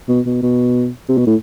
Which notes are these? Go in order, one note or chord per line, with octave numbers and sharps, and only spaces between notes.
B2
B2
B2
C3
B2
A2